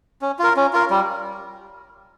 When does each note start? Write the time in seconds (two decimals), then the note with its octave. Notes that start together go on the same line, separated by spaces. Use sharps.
0.22 C#4
0.39 F4 A#4
0.57 C#4
0.73 F4 A#4
0.90 G3